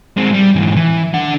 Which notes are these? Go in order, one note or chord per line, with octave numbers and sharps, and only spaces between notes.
G#3 C4
G3
G#2 E3
E3
D4 F#5